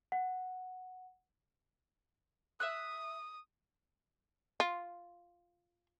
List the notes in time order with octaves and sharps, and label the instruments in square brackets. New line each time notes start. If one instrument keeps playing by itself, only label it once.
[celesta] F#5
[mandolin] E5 E6 F#6 [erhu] D#6
[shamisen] F4